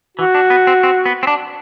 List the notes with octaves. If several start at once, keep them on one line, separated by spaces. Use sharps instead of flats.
E3 F#4
D4
B3
C4
C4
B3
C4
D4